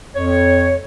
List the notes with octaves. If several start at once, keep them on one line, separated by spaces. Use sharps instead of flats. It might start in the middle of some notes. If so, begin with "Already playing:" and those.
F2 C#5